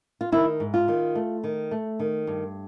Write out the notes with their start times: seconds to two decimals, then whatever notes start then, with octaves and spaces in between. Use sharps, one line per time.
0.21 F4
0.32 D#3 E4
0.60 G#2
0.74 F4
0.88 D#3
1.15 A3
1.44 D#3
1.71 A3
2.00 D#3
2.27 G2